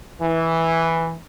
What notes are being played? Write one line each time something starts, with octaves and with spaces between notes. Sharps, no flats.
E3